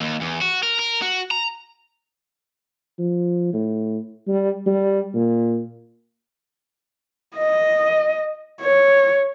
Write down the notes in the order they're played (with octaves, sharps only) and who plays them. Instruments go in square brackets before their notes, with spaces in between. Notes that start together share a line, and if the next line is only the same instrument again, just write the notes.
[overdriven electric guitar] D#2
E2
F#4
A#4
A#4
F#4
A#5
[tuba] F3
A2
G3
G3
A#2
[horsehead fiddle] D#5
C#5